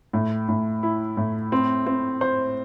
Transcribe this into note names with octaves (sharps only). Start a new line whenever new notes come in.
A2
A2
E4
A2
C4
C4
C5